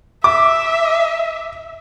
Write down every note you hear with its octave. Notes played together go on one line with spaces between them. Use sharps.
E5 D6